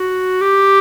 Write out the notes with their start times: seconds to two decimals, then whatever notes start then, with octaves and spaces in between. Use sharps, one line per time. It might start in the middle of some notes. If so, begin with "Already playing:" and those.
Already playing: F#4
0.41 G4